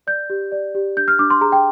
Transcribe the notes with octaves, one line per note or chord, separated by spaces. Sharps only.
D5 G6
G4
D5
G4
D4 G6
F6
D4 D6
C6
G#4 A#5
G5